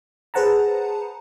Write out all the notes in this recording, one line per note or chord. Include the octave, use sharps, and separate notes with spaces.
G#4 B4 C5 F#5 A5 A#5